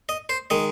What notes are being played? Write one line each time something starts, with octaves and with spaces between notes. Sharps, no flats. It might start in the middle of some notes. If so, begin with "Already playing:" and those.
D#5
C5
D#3 G#3 D#5